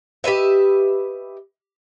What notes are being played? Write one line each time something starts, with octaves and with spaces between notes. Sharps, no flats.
G4 B4 D#5 E5